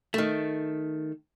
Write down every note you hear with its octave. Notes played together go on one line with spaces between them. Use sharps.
D#3 A3